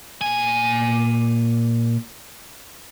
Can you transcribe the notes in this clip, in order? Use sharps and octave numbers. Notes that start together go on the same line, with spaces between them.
A#2 G#5